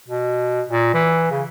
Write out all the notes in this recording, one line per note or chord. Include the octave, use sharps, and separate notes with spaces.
B2
A#2
E3
C#3